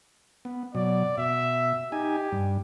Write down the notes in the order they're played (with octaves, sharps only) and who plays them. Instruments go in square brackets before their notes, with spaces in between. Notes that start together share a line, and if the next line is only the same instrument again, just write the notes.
[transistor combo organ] B3
[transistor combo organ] B2 F#3 [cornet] D5
[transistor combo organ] B2 [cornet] E5
[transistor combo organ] D#4 G#5 [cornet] G4
[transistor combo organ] G2